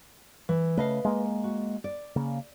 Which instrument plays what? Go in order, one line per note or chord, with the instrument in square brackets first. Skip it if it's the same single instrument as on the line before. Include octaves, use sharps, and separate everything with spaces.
[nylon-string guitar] E3
[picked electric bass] C#3 A3 [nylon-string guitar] B4 D#5 F5
[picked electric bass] G#3 A#3
[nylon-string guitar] F#4
D5
[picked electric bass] C#3 A#3